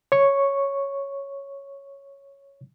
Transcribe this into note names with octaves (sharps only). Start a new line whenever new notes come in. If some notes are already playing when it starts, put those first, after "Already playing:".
C#5 C#6